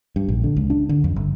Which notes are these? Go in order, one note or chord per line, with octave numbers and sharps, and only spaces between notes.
G2
A#1
D3
C#2
D4
D3
F2
G1